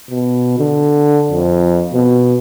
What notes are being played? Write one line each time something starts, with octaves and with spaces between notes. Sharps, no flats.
B2
D3
F2
B2